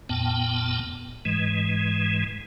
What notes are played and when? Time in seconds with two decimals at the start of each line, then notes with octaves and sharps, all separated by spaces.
0.09 F2 A#2 B3 G5 A5
1.25 G#2 E3 G#3